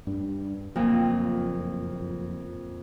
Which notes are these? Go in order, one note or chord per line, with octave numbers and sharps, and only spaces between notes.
G2 D4
F#1 F2 A#2 F3